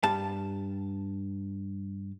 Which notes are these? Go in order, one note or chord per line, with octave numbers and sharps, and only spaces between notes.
G2 A5